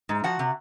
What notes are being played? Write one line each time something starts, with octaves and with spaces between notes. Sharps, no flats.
G#2
F3 F#4 F#5
C3